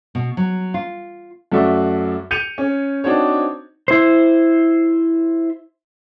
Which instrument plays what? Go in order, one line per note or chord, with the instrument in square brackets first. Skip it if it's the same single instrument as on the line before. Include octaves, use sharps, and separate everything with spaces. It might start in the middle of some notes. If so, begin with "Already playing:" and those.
[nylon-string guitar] B2
F#3
F4
[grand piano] F#2 A3 F#4 D5 E5 C#6
G6 C#7 D#7 F7
C#4
C4 D4 D#4 F#4 C5 C#5
[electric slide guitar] E4 C5